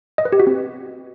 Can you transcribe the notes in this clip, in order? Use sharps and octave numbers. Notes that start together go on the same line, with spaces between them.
D#5
B4
G4
F#4
C4